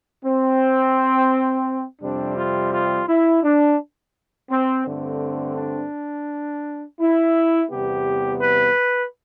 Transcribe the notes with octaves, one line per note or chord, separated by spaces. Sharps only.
C4
F2 C3 G3 C4 D4
F4
F4
E4
D4
C4
G2 D3 A3 C4
D4
E4
E2 C3 G3 B3 G4
B4